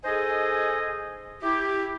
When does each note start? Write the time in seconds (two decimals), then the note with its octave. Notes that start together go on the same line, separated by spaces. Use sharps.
0.05 D#4 G#4 A4 C5 D#5 G#5
1.43 E4 G4